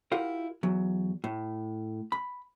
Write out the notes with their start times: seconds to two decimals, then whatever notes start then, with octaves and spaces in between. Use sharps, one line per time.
0.12 E4 F4 G4 A#4 F#5
0.63 E2 F#3
1.24 A2
2.12 B5